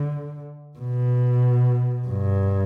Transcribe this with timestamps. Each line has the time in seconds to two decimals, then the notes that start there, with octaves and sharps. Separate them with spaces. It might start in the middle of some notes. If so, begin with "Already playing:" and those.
Already playing: D3
0.78 B2
2.08 G2